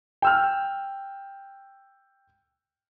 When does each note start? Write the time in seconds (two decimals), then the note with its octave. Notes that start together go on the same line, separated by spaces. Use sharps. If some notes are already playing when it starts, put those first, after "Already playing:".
0.22 G5 E6 F6